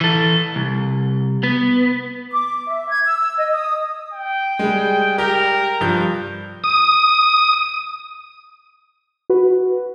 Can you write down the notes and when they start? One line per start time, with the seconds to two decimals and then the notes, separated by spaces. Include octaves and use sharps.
0.01 E3 A4
0.56 C2
1.43 B3
2.31 D6
2.66 E5
2.89 G#6
3.05 E6
3.18 E6
3.36 D#5
3.52 D#6
4.13 G5
4.59 G3 G#3
5.18 G4 A#4 G5
5.81 G2 F3 G6
6.64 D#6
9.30 F#4 B4